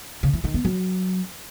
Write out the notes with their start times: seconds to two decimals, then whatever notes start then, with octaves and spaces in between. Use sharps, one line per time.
0.23 C#3
0.33 E3
0.44 D#3
0.54 B3
0.65 F#3